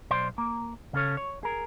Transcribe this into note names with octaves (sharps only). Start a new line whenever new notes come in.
B1 C5 D5 C6
A#3
C#3 C#4 A4 C#5
C#5
G#4 A#4